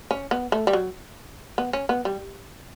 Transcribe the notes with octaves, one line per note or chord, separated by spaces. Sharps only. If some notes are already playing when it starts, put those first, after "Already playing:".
C#4
B3
A3
G3
F#3
B3
C#4
B3
G3